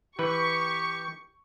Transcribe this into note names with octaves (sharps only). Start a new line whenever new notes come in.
E3 G4 B4 C#6